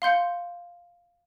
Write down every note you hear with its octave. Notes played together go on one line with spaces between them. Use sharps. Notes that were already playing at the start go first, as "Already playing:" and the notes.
F5 C6 G6 C#7